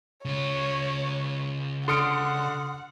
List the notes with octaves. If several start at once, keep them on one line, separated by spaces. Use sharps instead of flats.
C#3 F4 C#5
D3 F#5 C6 D#6 F6 C#7 D7